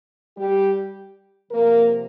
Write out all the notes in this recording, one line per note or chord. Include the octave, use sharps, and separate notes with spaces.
G3 G4
C3 F3 A#3 A#4